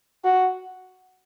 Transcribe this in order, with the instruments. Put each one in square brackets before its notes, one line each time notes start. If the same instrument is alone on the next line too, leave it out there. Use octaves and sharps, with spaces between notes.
[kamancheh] F#4